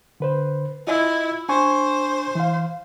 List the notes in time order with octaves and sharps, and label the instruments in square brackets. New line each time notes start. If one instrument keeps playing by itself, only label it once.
[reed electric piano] D3 B4 C5
[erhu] E4 [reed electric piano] F4 D#5
[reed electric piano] D4 G#5 C#6 [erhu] C5
[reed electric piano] E3 F5